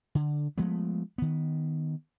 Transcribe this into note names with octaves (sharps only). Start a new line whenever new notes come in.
D3
F3 G#3 A3 B3
D#3 B3